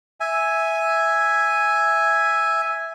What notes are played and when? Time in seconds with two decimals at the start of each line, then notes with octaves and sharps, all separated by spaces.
0.20 E5 G#5